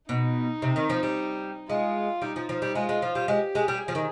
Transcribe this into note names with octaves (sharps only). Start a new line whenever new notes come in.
B2 D#4
C3
D#3
F3
G3
G#3 F4
G3 D#4
F3
F3
G3
G#3 F4
G#3
F3
G3
G#3 G4
G#3
G3
G#4
F3
D#3